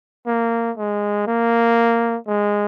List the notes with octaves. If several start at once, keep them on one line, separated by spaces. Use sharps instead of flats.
A#3
G#3
A#3
G#3